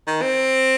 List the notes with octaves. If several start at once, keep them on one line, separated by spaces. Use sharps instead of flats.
D#3
C4